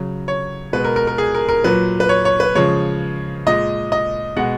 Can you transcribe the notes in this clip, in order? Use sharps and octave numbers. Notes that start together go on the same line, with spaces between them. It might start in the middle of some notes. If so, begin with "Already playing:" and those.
Already playing: C#3 F#3
C#5
B2 G#3 B4
A#4
A#4
A#4
G#4
A#4
A#4
A#2 F#3 B4
B4
C#5
C#5
B4
C#3 F3 G#3 C#5
A#2 G#3 D#5
D#5
B2 G#3 F#5